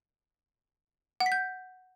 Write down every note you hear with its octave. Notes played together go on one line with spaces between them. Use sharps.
F#5
B6
G6